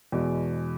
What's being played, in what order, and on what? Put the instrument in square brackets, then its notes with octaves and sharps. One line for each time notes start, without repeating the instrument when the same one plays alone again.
[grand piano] E2 B2 G#3